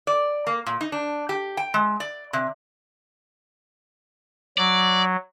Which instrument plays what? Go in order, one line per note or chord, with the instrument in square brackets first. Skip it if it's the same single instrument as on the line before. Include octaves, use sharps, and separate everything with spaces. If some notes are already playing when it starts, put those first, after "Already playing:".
[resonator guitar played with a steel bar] D5
A#3
A#2
D#4
D4
G4
G5
G#3
D5
C3
[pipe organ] F#3 [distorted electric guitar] D5